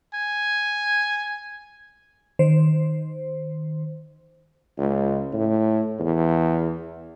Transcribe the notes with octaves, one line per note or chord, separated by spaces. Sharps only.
G#5
D#3 C5
C#2
A2
E2